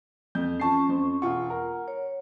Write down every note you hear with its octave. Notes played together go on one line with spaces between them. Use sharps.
F2 G6
F3 C#4 A5 C#6 C7
F2 C5
E1 F4 F#5 C#6
A#4
C#5